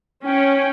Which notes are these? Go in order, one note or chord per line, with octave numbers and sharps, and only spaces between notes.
C#4 G5